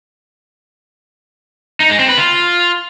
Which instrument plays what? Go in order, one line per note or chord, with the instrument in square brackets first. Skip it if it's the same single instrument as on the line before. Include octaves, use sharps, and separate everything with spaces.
[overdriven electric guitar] D#4
G#3
C4
B4
F4